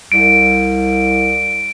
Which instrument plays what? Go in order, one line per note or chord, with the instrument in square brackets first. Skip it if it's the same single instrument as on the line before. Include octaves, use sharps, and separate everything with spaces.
[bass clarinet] C2 [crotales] D7